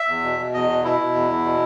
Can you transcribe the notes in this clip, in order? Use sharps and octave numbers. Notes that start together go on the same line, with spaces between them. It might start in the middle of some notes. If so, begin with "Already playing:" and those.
Already playing: E5
E2
B2
B2
E2 D#5
B2
B2 E4
B2
E2
E2
B2